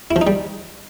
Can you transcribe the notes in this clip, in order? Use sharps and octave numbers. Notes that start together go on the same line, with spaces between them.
E4
F3
D#4
G3